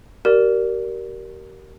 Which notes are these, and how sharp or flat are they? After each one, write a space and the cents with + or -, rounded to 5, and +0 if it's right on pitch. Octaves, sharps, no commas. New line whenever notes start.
G4 -35 A#4 +0 D5 +0